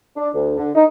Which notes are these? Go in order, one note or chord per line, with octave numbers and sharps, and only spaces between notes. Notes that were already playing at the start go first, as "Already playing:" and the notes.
D4
D2
D3
D#4